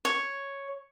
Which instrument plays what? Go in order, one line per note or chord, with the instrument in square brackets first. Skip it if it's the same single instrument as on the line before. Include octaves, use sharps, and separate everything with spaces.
[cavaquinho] C#5